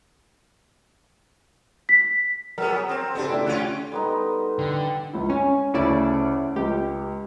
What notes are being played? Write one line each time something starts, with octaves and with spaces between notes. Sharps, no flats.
B6
F#3 B3 G#4 A#4
C4
C#3 B3 D4 G4 A4
A3 E4 D5
C#3 C#4 F4 F#6 D7
G3 B3 D#4 A4 C6
D3 G5
C#2 E4
C#4 G#5
D2 C#3 A3 C#4 E4 D5
C#2 G4